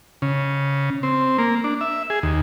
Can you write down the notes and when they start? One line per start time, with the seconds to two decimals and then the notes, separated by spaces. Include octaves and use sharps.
0.22 C#3
1.03 C4
1.38 A#3
1.64 D4
1.81 E5
2.10 G#4
2.23 D#2